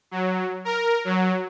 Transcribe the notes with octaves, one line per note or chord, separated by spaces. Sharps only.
F#3
A#4
F#3